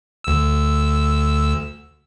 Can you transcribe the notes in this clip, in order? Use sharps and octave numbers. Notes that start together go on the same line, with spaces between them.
D2 E6